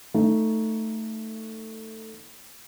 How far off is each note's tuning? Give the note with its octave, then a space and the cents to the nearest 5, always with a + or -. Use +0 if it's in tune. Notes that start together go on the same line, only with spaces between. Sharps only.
A3 +10 D#4 +10